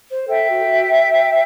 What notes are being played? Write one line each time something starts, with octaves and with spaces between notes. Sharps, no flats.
C5
A4 E5 G5
F#4
F#4